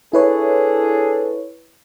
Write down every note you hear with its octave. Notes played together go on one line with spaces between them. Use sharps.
D4 E4 G#4 A4 B4 C#5